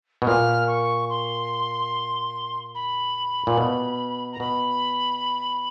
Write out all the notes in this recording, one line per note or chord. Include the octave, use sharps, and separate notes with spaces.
B2
A#2 F6
C#6
C6
B5
A#2
B2
A#5
B2 B5